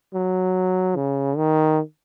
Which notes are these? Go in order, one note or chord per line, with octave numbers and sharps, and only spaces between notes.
F#3
C#3
D#3